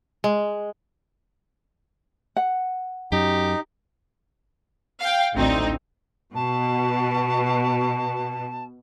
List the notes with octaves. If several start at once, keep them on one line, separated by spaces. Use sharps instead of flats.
G#3
F#5
F#2 D#4 G4
F5 G5
A1 D2 C4 D#4
B2 A5